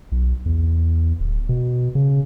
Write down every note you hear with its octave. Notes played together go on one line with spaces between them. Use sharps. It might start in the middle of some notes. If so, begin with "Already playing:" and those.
B1
E2
D1
B2
C#3